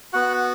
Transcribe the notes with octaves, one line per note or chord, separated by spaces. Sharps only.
B3 F#4 F#5